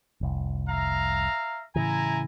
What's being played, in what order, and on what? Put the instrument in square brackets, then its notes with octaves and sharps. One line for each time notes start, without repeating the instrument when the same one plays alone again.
[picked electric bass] F1 C2
[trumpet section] E5 F5 A#5
[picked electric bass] A2 C#3 E3 [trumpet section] E4 G#5 A#5